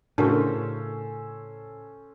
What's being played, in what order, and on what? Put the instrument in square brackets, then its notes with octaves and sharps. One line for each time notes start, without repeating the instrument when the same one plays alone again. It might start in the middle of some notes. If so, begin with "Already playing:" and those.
[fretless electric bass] A2 C#3 [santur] C#4 A4 C5 [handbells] D4 F#4 A#4